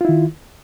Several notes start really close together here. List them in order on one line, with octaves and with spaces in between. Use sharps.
F4 E4 D#3